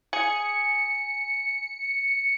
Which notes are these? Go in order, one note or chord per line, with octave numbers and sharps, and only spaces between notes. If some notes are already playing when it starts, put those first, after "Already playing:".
G#4 C#7